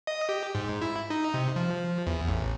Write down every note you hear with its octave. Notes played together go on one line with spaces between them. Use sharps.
D#5
G4
G#2
E4
D#4
C3
F3
E2
A1